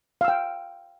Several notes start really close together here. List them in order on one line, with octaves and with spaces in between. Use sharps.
F5 E6 G5